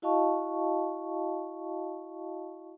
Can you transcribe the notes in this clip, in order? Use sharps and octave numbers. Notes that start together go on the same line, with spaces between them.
E4 F#4 D#5 F5 A5 C#6